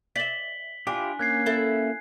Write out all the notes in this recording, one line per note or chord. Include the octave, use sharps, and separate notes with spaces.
D5 E5 B6 F#7 G7
D4 E4 F4 G4 G#5
A#3 C#4 F#6 G#6 C7
E4 A4